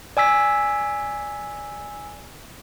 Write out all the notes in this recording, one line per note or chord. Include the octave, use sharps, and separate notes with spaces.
D5 G#5 E6 B6